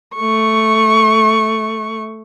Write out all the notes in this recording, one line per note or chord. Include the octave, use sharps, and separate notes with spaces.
A3 C#6